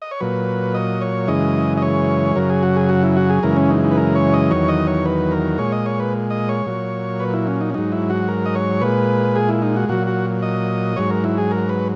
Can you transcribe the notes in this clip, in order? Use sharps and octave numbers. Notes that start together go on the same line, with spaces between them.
D#5
C#5
A#2 F#3 B4
D#5
C#5
F#2 C#3 E3 G#3 D#5
D#5
C#5
F#2 C#3 F#3 A#4
G#4
F#4
G#4
F#4
E4
F#4
G#4
F#2 C#3 E3 G#3 A#4
C#4
D#4
D#4
B4
A#4
C#5
D#5
E2 D#3 F#3 C#5
D#5
C#5
B4
A#4
A#2 G#3 C#5
D#5
C#5
B4
D#5
C#5
A#2 F#3
B4
E4
C#4
D#4
C#4
G#2 F#3 D#4
E4
F#4
A#4
D#5
C#5
A#2 G#3 B4
G#4
E4
D#4
F#4
A#2 F#3 F#4
F#4
D#5
G#2 F#3 C#5
A#4
E4
G#4
A#4
B4